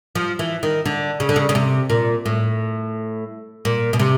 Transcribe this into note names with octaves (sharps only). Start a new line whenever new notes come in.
F3
E3
D#3
D3
C#3
D3
C#3
C#3
C3
A#2
A2
A#2
B2
C3